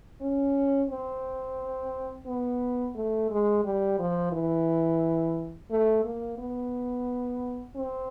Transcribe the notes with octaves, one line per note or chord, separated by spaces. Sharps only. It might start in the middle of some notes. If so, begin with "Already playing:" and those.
C#4
C4
B3
A3
G#3
G3
F3
E3
A3
A#3
B3
C4